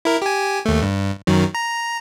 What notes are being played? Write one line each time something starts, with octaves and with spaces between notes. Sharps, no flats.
E4 A#4
G4 G#5
D#2 A3
G2
F#2 D#3 F#3
A#5